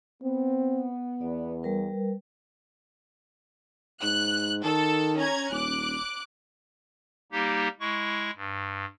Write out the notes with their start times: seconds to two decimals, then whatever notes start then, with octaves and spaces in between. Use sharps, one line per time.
0.23 B3 C4
1.21 E2 D5
1.63 G3 A#4 B4
4.03 G#2 F#6
4.64 D#3 A4
5.17 C#4 A#5 G#6
5.51 D#1 D6 F#6
7.32 G3 A#3 D#4 G4
7.80 G#3 E4 C#6
8.36 G2